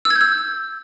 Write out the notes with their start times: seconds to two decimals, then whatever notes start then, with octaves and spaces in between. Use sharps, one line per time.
0.05 E6
0.10 G#6
0.16 G6
0.21 E6